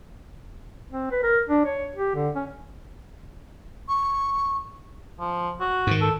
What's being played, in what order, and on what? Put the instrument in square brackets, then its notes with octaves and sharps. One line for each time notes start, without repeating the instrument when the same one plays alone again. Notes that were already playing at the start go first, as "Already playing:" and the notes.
[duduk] C4
B4
A#4
D4
C#5
G4
D3
C#4
[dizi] C#6
[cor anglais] F3
F#4
[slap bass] G#2 D#3
[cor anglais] A4